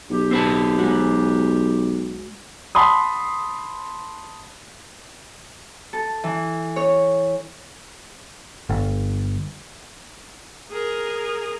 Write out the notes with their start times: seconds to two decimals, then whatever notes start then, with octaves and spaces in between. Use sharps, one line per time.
0.10 B1 G4
0.31 C4 B4 A5
0.79 G#3 F#4
2.75 F#5 A5 B5 C6 D#6
5.93 A4
6.24 E3
6.76 C#5
8.69 G1
10.71 G#4 A#4